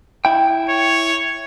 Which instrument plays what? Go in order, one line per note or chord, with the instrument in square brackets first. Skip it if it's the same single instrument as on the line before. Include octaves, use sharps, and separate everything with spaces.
[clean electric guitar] E4 G5
[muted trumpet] C#5